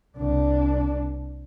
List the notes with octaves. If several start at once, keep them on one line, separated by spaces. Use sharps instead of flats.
C2 D4